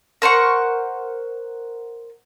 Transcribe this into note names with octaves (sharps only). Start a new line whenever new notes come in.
A#4 C5 F#5 C#6